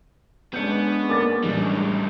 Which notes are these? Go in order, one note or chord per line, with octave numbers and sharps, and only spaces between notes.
G#3 B3 C#4 D4 G6 C#7
A#3 D6 A6
A1 A2 G3